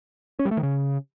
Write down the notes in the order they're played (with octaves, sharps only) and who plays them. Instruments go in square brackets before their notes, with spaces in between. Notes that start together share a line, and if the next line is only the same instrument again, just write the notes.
[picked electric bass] C#4
G3
A3
D#3
C#3